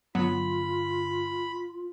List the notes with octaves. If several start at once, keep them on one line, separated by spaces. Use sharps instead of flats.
G2 D3 F#3 B3 F4 B5